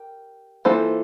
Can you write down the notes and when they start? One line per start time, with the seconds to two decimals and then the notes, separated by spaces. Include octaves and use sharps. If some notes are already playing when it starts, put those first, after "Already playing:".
Already playing: G4 A#4
0.65 E3 A#3 F4 A4 C5